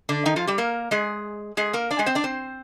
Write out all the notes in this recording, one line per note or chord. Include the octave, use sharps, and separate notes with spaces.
D3 D4
D#3 D#4
F3 F4
G3 G4
A#3 A#4
G#3 G#4
G#3 G#4
A#3 A#4
D4 D5
G#3 G#4
C4 C5
D4 D5
C4 C5